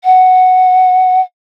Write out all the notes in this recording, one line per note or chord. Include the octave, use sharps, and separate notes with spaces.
F#5